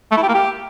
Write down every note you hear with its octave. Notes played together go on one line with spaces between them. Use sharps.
A3
E4
G4
A#3
G4